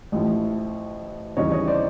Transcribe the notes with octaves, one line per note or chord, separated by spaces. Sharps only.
A1 A2 F3
D#2 C#3 E3 G3 C#5 D#5
C#5 D#5
C5 D5